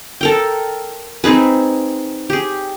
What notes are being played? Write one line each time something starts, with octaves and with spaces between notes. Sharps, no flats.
A4 A#4 G5
C4 D#4 G#4 B4
G4 G#4